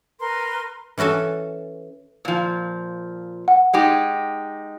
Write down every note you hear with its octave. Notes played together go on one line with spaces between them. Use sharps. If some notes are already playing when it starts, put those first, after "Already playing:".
A#4 B4 C6
E3 C#4 F#4 A4 G#5
A#2 F3
F#5
G#3 D#4 G4